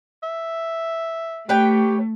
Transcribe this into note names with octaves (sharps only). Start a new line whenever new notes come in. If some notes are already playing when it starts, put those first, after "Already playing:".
E5
A3 G4 B4 C#5 G5